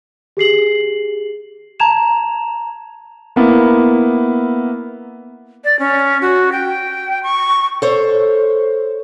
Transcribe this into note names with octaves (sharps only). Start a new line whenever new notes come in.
G4 G#4 C7 F#7
A5 A#5 G#6 E7 F7
A#3 B3 E4
D5
C#4
F#4
G5
C#6
A4 C5 C#5